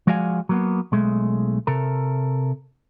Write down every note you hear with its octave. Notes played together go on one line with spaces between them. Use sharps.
F3 G#3 F#4 D5 F5 G#5
F#3 A#3 B3
B1 G#3 A3
C3 A4 A#4